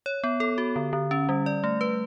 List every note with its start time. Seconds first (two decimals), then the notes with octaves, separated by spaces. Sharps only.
0.06 C#5
0.24 B3
0.40 A4
0.58 F#4
0.76 D3
0.93 D3
1.11 C#4
1.29 G3
1.46 D5
1.64 A3
1.81 B4